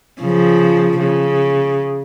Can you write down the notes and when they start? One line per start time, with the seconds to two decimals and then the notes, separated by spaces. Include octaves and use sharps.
0.21 C#3 F3
0.99 C#3